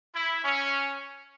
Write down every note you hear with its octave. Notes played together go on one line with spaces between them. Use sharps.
E4
C#4